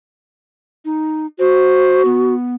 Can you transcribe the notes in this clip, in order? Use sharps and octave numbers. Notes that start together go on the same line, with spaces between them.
D#4
F#4 C5
B3